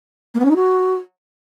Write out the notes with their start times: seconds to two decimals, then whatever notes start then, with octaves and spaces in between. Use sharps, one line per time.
0.34 A#3
0.40 B3
0.45 C#4
0.50 D#4
0.56 F#4